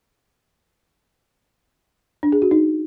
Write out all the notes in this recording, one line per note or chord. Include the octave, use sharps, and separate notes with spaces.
D4
G#4
F#4
D#4